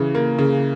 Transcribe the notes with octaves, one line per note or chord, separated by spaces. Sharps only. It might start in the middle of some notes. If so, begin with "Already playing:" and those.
Already playing: C#3 E3
A#3
C#3